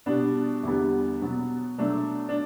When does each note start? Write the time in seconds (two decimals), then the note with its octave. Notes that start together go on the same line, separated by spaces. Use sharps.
0.06 B2 G3 B3 D4
0.63 E2 D3 G3 B3
1.21 B2 F#3 B3
1.78 B2 F#3 A3 D4
2.29 D4